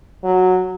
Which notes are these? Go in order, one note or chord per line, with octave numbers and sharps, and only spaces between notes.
F#3